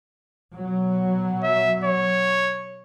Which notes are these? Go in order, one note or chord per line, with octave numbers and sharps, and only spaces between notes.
B2 F#3
E5
C#5